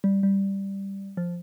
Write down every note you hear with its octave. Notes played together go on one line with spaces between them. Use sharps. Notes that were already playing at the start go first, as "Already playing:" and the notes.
G3
G3
F3